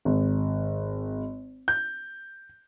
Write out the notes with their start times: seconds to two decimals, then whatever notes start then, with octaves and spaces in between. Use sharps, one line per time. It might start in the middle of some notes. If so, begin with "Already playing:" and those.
0.05 G#1
1.68 G6